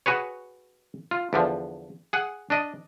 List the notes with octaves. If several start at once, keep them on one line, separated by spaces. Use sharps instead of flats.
F#4 G#4 B4 C#5
F4
E2 D3 F3
G#4 F#5
D4 D5 D#5